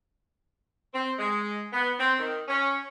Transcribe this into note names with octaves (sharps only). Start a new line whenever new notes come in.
C4
G#3
B3
C4
D#3
C#4